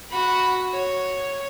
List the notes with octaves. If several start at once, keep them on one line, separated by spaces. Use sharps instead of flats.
F#4 B5
C#5